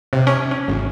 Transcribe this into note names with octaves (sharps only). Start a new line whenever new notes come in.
C3
C#4
C#4
G#1